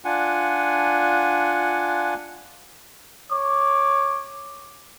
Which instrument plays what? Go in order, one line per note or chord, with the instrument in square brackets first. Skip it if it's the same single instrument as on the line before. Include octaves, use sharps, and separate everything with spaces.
[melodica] D4 F4 F#5 G#5
[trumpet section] C#5 D6